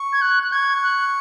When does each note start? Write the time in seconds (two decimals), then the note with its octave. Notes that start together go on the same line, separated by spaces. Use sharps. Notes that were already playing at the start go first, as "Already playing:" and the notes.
Already playing: C#6
0.13 G#6
0.22 F#6
0.43 F#6
0.52 C#6 G#6
0.83 F#6